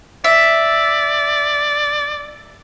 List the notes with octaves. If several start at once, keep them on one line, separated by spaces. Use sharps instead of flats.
D5 E5